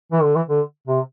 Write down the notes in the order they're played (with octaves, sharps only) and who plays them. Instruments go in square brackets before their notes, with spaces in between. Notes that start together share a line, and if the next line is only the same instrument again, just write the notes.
[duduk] E3
D3
E3
D3
C3